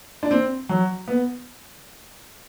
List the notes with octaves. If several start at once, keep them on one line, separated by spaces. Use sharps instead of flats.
D4
C4
F#3
B3